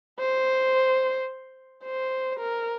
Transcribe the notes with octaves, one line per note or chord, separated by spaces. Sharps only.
C5
C5
A#4